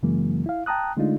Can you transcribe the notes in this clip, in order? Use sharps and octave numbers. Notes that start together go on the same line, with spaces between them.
F#2 C#3 E3 F#3 G#3 A#3
E4 F5
G5 A5 A#5 D#6 F#6
D3 G#3 A3 D4 D#4 F4